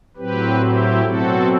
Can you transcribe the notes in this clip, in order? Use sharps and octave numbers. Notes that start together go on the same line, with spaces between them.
A2 F#3 C4 G4 B4
E4 G4
B2 F#3 C4 F#4 A4